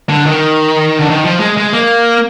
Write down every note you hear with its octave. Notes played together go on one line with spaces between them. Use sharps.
D3
D#3
D3
D#3
F3
G#3
G#3
A#3